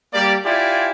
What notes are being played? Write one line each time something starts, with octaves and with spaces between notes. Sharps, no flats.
G3 A#3 G4 D5
E4 F4 G4 D5 G#5